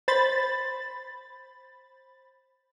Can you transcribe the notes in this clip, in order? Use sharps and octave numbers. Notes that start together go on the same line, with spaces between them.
C5 B5 A6